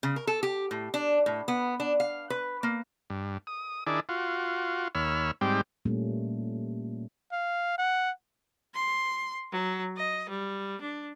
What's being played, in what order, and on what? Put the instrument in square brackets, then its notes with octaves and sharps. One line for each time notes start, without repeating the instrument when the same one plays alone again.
[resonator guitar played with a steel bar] C#3
A#4
A4
G4
A2
D4
A2
B3
D4
F5
B4
A#3
[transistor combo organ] G2
D#6
D#3 D4 E4 G#4 D5
F4 F#4
D#2 C#5 B5 E6 F6
G#2 G3 C4 G4
[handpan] A#2 G3 A3 A#3 C#4
[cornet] F5
F#5
[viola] C6
F#3
D#5
G3
D4